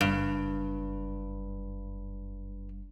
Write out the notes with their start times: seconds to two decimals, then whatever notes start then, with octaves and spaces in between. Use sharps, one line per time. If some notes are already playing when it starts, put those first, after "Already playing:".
0.01 F#1 G2 D#4